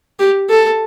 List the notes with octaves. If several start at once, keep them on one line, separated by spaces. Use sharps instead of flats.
G4
A4